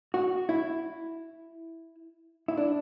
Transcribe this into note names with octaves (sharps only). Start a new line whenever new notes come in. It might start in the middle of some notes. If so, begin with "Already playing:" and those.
F#4
E4
E4
D4